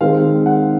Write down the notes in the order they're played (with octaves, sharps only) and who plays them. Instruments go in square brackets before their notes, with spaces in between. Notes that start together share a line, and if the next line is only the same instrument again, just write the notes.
[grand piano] D#3 G#3 C4 F5
F#5